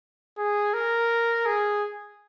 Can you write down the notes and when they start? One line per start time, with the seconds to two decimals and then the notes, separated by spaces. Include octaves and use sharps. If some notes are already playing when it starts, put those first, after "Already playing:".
0.38 G#4
0.74 A#4
1.46 G#4